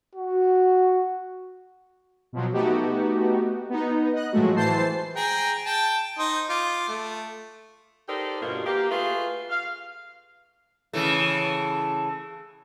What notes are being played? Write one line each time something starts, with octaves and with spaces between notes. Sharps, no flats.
F#4
B2 F3 F#3
A3 B3 D#4 F#4 G4
B3 D#4
D#5 F#6
A2 F3 F#3 G#3 A3 F#4
E3 C5 A5 C7
G#4 G5 A#5
G5 A5
D#4 C5 D#6
F4 D6
A3
D#4 G4 A4 A#4 C5 D5
G2 B2 A3 A#3 F4 F#4
A#3 G4
A3 F4 F#4 G#4 B4
F5
C#3 E3 A3